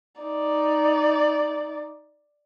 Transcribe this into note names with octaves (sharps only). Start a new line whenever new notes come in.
D#4 D5